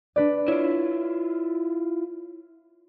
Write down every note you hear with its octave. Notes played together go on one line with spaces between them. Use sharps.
D4 B4 D5
E4 F4 C#5 D7